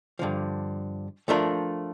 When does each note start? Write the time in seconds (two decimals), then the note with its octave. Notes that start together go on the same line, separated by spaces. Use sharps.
0.19 G2 D3 F3
1.28 F3 A3 D4 F4 A#4